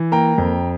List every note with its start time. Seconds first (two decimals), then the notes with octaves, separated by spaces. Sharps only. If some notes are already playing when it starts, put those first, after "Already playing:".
Already playing: E3
0.12 A#3 G5 A#5
0.38 F2